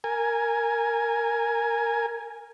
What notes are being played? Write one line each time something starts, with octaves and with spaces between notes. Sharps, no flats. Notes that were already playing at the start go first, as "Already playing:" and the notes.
A#4 G#5